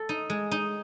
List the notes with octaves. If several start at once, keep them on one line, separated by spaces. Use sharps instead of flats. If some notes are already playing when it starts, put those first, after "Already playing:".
Already playing: A4
D#4
G#3
D#4